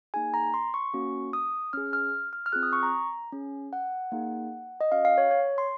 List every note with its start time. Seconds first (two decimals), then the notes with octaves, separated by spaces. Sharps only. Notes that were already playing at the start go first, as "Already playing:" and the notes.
0.14 A#3 D#4 G#4 G#5
0.34 A#5
0.54 C6
0.74 C#6
0.94 A#3 C#4 F#4
1.33 D#6
1.73 C#4 G#4 F6
1.93 F6
2.33 F6
2.46 F6
2.52 C4 F4 G#4 F#6
2.63 D#6
2.73 C#6
2.83 A#5
3.32 C#4 G#4
3.73 F#5
4.12 A#3 D#4 G#4
4.81 D#5
4.92 C#4 F#4 F5
5.05 F5
5.18 C#5
5.31 C#5
5.58 C6